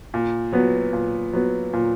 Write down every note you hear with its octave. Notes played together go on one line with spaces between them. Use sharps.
A#2
F#3 B3
A#2
F#3 B3
A#2